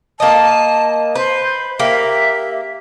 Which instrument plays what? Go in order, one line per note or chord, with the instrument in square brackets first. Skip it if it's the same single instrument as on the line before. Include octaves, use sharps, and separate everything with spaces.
[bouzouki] A#3 D#5 [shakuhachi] A5
[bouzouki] B4 [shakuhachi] C5
[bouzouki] A#3 G4 [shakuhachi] E5